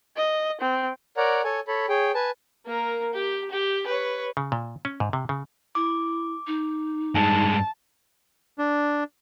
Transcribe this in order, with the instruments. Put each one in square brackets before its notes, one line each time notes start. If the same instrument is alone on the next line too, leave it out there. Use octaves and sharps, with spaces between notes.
[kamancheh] D#5
C4
[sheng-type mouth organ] A#4 C#5 D5 F#5 A#5
A4 C#5 G#5
A4 C#5 B5
G#4 C#5 G5
B4 G#5 A5
[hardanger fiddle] A#3 A#4
G4
G4
B4 C#5
[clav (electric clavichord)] C#3
A#2
C#4
G#2
C3
C#3
[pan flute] E4 [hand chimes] D6
[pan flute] D#4
[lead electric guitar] G2 G#3 [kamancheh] A5
[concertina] D4